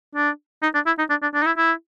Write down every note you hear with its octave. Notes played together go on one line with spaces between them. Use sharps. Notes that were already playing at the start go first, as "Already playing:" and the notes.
D4
D#4
D4
E4
D#4
D4
D4
D4
D#4
E4
E4